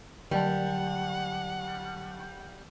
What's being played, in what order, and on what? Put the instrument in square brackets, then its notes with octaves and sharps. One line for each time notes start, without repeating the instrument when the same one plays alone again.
[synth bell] D3 F#3 A5 [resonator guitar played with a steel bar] G3 [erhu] F#5